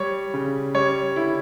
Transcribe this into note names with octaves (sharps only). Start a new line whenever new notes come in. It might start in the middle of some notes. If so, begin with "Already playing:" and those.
Already playing: G3 C#5
C#3
G3 C#5
D3 E4